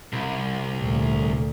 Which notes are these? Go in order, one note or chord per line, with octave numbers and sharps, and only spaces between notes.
C2
D2 A#2